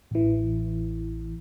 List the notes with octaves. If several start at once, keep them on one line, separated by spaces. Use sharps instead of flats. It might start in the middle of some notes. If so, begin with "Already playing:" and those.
A1 E3